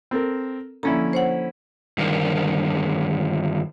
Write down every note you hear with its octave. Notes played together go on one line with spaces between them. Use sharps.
C4 A4 A#4
D3 F3 A#3 C#4 E4 A#5
C5 C#5 F#5
G2 D3 D#3 A#4